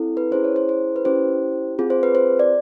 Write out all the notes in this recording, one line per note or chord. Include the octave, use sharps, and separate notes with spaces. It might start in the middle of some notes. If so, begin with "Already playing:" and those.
Already playing: C4 E4 A4
B4
C#4 E4 G#4 C5
C#5
C5
C5
B4
C#4 E4 G4 C5
C4 F4 G#4
C5
B4
C5
D5